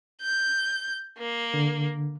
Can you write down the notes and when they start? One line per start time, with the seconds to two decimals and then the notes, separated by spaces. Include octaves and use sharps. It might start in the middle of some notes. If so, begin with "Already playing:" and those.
0.22 G6
1.19 A#3
1.54 D3